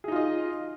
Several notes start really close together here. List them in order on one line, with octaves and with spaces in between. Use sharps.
G#4 D#4 F4 D#5